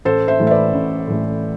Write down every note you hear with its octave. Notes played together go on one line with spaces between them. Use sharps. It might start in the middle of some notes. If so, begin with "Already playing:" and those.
A1 A4 C5
C5 E5
A2 E3 A3
E5
B4 D5
A1
A2 E3 A3